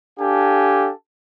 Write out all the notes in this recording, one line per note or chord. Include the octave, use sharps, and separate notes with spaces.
D4 G4 A4 F5 G#5 A5